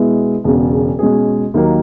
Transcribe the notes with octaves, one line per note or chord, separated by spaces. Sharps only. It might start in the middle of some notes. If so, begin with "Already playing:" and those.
Already playing: B2 G#3 B3 E4
E1 E2 C#3
B2 G#3 C#4 G#4
D#2 D#3 F#3 A#3